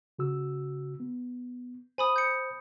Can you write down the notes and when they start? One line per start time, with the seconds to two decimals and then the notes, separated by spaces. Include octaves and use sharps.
0.19 C#3 F#4 E6
1.00 B3
1.98 C5 G#5 B5 D#6
2.16 G6 C#7